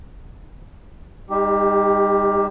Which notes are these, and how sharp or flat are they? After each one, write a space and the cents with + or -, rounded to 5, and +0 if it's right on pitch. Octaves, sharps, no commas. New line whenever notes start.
G3 +40 D#4 +0 G4 +5